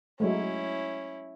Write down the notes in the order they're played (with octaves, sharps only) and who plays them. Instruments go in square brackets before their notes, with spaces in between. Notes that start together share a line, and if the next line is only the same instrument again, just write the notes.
[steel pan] F#3 G#3 A3 [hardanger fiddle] C#4 E4